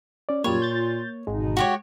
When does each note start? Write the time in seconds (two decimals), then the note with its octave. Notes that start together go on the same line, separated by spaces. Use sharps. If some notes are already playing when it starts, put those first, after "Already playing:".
0.29 C#4 D5
0.44 F#2 A#2 G3 A#3 F4 C#5 G#6
0.62 G6 A6
1.27 G#1 B2 D3 G#3 D#4
1.57 F#4 G4 C#5